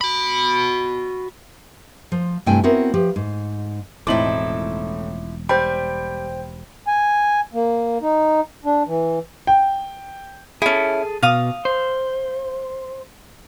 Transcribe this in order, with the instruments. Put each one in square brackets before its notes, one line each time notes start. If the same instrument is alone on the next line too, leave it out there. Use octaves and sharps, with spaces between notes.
[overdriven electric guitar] F#4 B5
[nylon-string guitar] F3 C5
G2 C3 A3 E4 G5 G#5
B3 C4 E4 F#4 A#4 C#5
F3 G4 B4
G#2
[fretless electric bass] E1 C4 [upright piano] A2 F#7 [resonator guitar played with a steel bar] F3 D#4 E4 [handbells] D6
[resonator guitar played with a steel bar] G3 [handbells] C5 G5 [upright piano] B5
[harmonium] G#5
A#3
D#4
D4
E3
[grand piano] G5
[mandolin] C#4 E4 [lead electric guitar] G#4 A4
[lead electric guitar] B2 [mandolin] F5 D#6
[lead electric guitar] C5